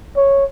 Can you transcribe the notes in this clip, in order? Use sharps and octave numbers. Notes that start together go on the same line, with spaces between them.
C#5